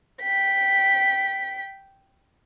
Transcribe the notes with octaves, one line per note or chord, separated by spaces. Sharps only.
G5 B6